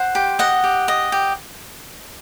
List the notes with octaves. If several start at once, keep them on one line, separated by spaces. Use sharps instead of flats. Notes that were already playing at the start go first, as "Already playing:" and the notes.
Already playing: C5 F#5
G4
D#5 F#5
G4
D#5
G4